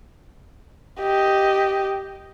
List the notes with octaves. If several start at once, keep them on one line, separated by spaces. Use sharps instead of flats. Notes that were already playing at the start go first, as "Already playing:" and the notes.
G4 D#5